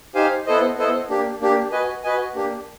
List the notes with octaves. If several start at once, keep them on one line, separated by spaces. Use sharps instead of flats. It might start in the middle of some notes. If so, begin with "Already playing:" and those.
D#4 G4 C5 F5 G#5
B3 E4 A4 C5 D#5
B3 E4 A4 C5 D#5
A#3 D4 G4
A#3 D4 G4
F#4 B4 D#5 G#5
F#4 B4 D#5 G#5
A#3 D4 G4